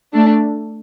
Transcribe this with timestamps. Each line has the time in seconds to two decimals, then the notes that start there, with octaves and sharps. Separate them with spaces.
0.14 A3 D4